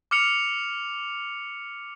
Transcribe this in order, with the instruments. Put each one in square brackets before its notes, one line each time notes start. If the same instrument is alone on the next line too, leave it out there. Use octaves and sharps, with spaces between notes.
[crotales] D6 F6 C#7 F7